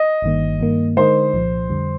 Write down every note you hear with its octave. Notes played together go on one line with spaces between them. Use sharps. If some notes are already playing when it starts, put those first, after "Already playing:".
Already playing: D#5
G1 G2 D#3 A#3
G2 D#3 A#3
D3 G#3 D#4 A#4 C5 D#5
C2 A#2 F3
F2 D3 G3